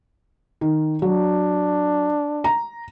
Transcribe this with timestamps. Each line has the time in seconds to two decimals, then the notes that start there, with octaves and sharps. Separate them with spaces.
0.61 D#3
1.02 F#3 D4
2.44 A#5